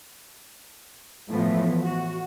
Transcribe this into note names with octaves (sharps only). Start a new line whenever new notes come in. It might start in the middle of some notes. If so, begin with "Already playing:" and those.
A2 E3 F3 B3
F#4